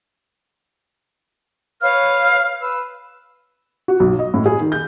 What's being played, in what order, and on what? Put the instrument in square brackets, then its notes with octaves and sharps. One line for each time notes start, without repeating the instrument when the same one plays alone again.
[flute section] B4 C#5 F5 F6
B4 E6
[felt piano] F#4
B1
D#5
A2
G#4
D#3
G6